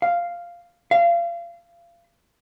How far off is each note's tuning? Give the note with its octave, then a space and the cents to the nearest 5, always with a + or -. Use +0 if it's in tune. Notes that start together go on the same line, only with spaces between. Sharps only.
F5 -5
F5 -30